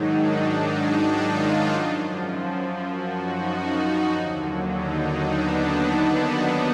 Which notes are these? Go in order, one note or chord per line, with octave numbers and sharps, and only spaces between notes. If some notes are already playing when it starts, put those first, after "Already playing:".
Already playing: G#2 D#3 F#3 D4 D#4
D4
D#4
F4
F#2 F3
F#4
D#4
D#2 D3 F#3
D#4
D4
B3
B3